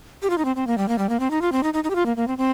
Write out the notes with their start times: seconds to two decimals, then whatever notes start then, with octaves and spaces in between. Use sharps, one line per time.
0.22 G4
0.30 F4
0.38 D#4
0.45 C4
0.56 C4
0.67 A#3
0.78 G3
0.88 A#3
0.98 G3
1.09 A#3
1.20 C4
1.31 D#4
1.42 F4
1.52 C4
1.63 D#4
1.74 D#4
1.84 D#4
1.90 G4
1.95 F4
2.06 A#3
2.17 A#3
2.28 C4
2.38 C4